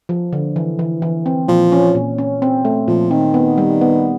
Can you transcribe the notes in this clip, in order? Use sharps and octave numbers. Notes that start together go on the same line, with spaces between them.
F3
D3
E3
E3
E3
C4
A#2 F3
C#4
A#2
C#4
C4
A3
A#2 F3
D#3 C4
B3
G3
B3